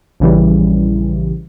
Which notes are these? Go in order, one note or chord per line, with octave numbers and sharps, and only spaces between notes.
A#1 C#3 E3 G3